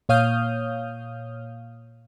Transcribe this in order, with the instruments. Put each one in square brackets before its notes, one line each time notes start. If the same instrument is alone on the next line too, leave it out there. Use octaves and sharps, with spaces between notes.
[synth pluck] A#2 C#5 F5 D#6 F6 G6